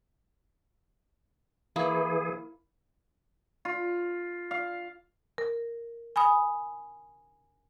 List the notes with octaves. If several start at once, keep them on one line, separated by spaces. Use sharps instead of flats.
E3 A#3 E4 G#4
F4
F5
A#4
G#5 B5 D#6